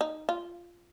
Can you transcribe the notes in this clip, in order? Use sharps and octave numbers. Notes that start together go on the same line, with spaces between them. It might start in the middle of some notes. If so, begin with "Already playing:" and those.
D#4
F4